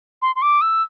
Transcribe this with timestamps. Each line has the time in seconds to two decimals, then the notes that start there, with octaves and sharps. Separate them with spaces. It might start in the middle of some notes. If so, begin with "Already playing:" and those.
0.22 C6
0.36 C6
0.42 D6
0.61 E6